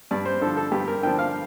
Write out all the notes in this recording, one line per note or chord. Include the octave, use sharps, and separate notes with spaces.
G2 D5
C5
D3 F3 A4
A4
G2 G4
A#4
D3 F3 G5
F5